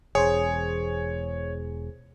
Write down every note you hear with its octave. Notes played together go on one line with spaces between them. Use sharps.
E1 E2 G#4 C5 C#5